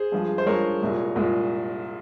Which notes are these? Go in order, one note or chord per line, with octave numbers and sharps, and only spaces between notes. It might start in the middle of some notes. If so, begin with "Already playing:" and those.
Already playing: G#4 C5
G2 F3 G#3
C5
G2 F3 G#3 A#4 C#5
C2 A#2 G#3
C2 A#2 G#3